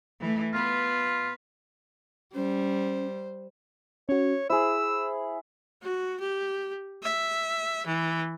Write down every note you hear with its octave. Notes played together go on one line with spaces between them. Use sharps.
E3 A3
B3 F4 B4
G3 C#4 C5
C#4 F#4 C#5
E4 G#4 C5 E6
F#4
G4
E5
E3